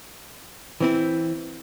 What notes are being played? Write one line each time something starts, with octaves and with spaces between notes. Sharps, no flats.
E3 C4 E4